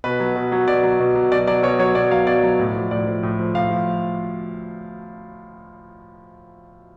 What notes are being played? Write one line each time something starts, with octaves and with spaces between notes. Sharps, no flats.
B2 B4
F#3
B2
F#3
B2 D5
F#3
B2
F#3
B2 D5
F#3 D5
B2 C#5
F#3 C#5
B2 D5
F#3 F5
B2 D5
F#3
A2
F3
A2 D5
F3
A2
F3
A2 F5
F3